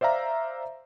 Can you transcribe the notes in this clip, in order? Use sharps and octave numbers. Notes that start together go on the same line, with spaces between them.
C5 D5 E5 F5 A#5